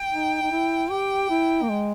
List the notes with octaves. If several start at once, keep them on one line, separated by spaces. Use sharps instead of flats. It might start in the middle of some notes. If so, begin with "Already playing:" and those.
Already playing: G5
D#4
D#4
E4
G4 G5
E4
A#3
G#3